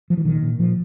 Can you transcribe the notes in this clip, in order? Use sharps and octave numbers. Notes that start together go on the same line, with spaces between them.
F3
E3
A#2 D#3
A#2
A#2 F3